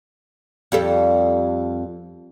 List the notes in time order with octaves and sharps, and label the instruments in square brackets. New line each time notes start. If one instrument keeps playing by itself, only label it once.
[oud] F2 G3 A4